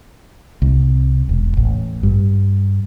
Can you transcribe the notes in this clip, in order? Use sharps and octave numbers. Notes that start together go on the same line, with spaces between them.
C2
E1
A1
G2